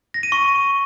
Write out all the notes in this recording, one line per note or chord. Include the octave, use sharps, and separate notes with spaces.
A#6
D#7
C#6